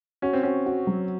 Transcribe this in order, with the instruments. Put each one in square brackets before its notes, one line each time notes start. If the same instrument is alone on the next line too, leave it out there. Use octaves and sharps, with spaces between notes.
[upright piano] C#4 [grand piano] F#4
[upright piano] C4
[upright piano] C#4 [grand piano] F#4
[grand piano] F#4
F#3